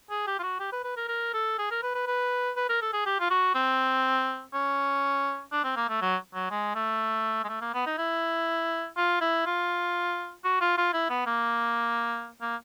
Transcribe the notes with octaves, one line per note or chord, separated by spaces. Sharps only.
G#4
G4
F4
F#4
G4
B4
B4
A#4
A#4
A4
G#4
A#4
B4
B4
B4
B4
A#4
A4
G#4
G4
F4
F#4
C4
C#4
D4
C4
A#3
A3
F#3
F#3
G#3
A3
G#3
A3
A#3
B3
D#4
E4
F4
E4
F4
F#4
F4
F4
E4
B3
A#3
A#3